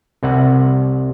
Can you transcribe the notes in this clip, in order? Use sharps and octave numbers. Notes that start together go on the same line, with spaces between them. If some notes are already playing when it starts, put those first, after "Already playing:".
C2 C3 F#5